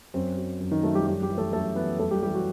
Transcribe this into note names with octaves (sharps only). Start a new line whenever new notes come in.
F#2 C4
F#3
F#2
D#3 D#4
F#3 A3 A4
G3 G4
F#2 G3 G4
G3 G4
E3
A3 A4
F#2 A3 A4
E3 B3 B4
F#2 A3 A4
G3 G4
E3 G3 G4
F#3 F#4